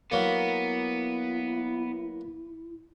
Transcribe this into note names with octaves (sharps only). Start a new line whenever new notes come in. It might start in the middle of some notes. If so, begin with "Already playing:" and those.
F#3 A#3 B3 E4